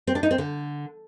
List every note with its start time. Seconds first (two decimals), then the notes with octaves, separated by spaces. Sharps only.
0.07 C4
0.15 D4
0.23 D#4
0.31 C4
0.38 D3